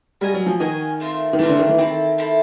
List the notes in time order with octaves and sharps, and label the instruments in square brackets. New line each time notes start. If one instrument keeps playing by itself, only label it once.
[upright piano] G3 [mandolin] F#4 A#4 D#5 G#5
[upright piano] F#3
F3
[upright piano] D#3 [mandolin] F#4 A#4 D#5 G#5
[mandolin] A3 C4 F4 A#4
[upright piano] D#3
[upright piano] E3 [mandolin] A3 C4 F4 A#4
[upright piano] D3
D#3
E3
[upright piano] D#3 [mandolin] C4 E4 A4
[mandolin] C4 E4 A4